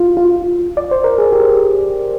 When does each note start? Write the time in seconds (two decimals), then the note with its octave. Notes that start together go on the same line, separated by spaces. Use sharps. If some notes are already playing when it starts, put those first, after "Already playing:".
Already playing: F4
0.17 F4
0.77 D5
0.91 C5
1.04 A#4
1.18 G#4
1.32 G4